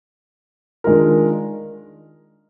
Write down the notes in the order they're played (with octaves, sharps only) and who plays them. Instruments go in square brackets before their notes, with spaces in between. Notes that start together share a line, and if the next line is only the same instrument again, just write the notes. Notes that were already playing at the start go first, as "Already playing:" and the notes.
[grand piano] D#3 G#3 D4 F4 A#4